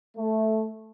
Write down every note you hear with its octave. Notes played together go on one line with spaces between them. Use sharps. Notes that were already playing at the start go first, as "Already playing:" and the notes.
A3